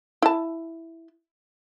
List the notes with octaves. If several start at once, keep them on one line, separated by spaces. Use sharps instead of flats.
E4 A5